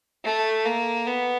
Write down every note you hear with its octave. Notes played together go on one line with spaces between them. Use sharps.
A3
A#3
B3